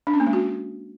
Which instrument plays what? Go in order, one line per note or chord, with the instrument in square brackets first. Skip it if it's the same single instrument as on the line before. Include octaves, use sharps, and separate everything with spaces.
[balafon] D4
C#4
A#3
G#3
F#4